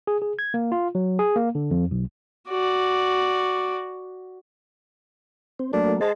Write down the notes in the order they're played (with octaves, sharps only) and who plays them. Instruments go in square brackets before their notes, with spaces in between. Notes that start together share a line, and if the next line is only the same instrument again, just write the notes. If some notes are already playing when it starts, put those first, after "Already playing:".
[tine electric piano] G#4
G#4
G#6
A#3
F4
F#3
G#4
A#3
D3
F2
B1
[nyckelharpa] F#4 D5
[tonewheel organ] C4
[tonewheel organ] F#3 A3 A#3 [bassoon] D4
[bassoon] G#3 [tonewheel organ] C5 A5